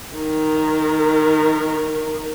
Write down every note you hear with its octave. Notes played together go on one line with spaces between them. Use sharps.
D#3 A#4